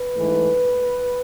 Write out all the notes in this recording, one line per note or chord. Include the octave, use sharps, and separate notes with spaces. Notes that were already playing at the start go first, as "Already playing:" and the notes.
Already playing: B4
G#2 E3 A3